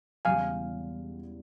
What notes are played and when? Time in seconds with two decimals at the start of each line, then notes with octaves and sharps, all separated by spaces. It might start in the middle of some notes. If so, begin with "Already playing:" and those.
0.25 E1 E2 C#3 E3 G3 F5 G#5